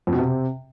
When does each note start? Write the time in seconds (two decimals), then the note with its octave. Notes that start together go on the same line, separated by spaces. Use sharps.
0.07 F2
0.13 B2
0.18 C3